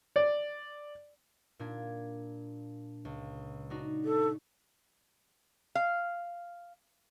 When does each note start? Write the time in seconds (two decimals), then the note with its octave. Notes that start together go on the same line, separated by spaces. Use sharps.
0.16 D5
1.59 A#2 D4 G#6
3.05 C#2
3.70 D4 D#4 F#4
4.05 A4
5.75 F5